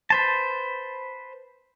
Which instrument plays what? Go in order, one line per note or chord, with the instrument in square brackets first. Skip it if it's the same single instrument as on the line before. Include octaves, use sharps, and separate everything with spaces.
[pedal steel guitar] B4 C5 A5